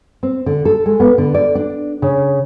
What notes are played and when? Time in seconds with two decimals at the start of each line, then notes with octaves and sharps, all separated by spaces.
0.23 C4
0.46 D3
0.65 A4
0.86 G#3
1.00 B3
1.18 D3
1.34 D5
1.55 D4
2.02 C#3